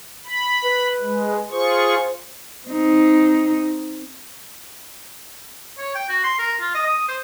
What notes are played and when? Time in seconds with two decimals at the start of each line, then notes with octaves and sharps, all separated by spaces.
0.25 B5
0.63 B4
1.00 G#3
1.52 F4 G#4 C5 C#6
2.67 C4 D#4
5.78 C#5
5.95 G5
6.09 F#4
6.24 C6
6.39 A#4
6.61 F4
6.74 D#5
6.87 D#6
7.08 C5